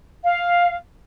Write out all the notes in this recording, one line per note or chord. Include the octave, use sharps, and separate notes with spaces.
F5